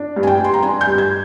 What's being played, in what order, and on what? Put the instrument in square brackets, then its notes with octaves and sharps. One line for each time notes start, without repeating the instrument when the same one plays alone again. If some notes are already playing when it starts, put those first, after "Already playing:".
Already playing: [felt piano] D4
G2
G#5
G5
G2 C6
A#5
D4 G#5
G6
G2
G#6